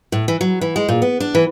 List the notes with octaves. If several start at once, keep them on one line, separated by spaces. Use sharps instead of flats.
A2
E3
F#3
E3
G#3
A#2
B3
D4
E3